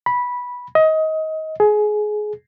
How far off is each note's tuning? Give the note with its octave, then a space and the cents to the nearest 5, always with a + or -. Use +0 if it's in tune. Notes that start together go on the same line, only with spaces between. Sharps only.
B5 -10
D#5 +20
G#4 +20